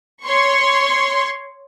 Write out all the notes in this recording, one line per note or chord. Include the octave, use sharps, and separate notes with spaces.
C#5 C6 C#6